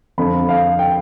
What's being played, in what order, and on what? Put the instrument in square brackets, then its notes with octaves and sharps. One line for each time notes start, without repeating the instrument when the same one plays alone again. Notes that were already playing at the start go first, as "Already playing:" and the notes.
[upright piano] F2 D3 F3 B5
F5
G5